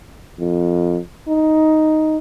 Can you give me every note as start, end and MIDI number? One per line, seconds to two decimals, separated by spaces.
0.39 0.99 41
1.28 2.17 63